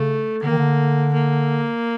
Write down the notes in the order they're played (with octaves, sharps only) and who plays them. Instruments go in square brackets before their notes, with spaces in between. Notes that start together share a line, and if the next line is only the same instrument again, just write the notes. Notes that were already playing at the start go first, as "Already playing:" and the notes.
Already playing: [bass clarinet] C#3 [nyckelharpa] A3
[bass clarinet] D3 [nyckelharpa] A#3
[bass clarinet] D#3
D3
[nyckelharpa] A#3